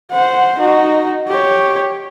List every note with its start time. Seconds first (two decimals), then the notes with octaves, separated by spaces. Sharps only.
0.11 C5 F#5
0.59 D#4 F#4
1.28 G4 C#5